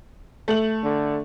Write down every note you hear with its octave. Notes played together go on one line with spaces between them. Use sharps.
A3 F#7
D3